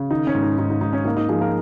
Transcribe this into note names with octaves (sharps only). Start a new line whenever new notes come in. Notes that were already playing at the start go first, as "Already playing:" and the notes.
Already playing: C#3
D#3 D#4
C#4
G#2
D#4
G#2 D#4
D#4
G#2 D#4
C#4
A#3 D#4
D#4
F3 D#4 G#4
F4 A#4